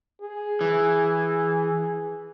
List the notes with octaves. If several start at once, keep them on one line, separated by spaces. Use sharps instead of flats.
G#4
E3